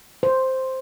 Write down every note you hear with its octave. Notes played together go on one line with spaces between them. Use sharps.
C5